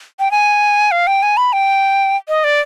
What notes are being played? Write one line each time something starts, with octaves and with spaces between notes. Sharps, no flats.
G5
G#5
F5
G5
G#5
B5
G5
D#5
D5